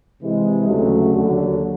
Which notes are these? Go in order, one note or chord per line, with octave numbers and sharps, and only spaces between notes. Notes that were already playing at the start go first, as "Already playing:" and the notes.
C3 E3 G#3
D2 C#3 F#3 A3
D#2 D3 F#3